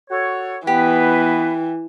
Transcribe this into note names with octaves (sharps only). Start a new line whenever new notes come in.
F#4 A4 C#5
E3 B3 G4 B4